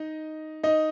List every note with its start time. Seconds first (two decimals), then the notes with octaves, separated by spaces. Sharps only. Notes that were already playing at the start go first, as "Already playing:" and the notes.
Already playing: D#4 D#5
0.63 D#4 D#5